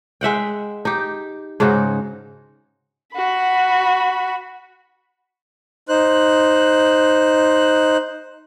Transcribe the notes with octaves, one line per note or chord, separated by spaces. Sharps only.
G#3 E5 F#5 G5
D#4 G4
G#2 C#3 D#4 F#4
F#4 B5
D#4 C5 F#6